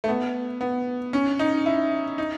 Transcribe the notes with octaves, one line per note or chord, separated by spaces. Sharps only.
A3
B3
B3
C#4
D#4
E4
D#4